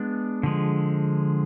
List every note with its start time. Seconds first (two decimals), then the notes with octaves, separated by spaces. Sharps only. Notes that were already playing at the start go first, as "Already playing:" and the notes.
Already playing: G#3 B3 D4
0.43 D3 F3 G#3